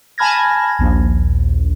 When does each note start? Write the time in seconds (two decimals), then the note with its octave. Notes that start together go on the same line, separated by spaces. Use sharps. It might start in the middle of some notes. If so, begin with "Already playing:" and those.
0.18 G#5 A5 B5 F6 G#6 A#6
0.79 A#1 D#2